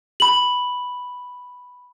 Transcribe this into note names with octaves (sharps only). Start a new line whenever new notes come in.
B5 F#7